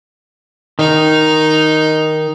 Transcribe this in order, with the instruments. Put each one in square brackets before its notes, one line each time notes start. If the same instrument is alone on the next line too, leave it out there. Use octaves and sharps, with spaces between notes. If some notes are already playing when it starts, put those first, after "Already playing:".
[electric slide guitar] D#3 [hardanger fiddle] D#4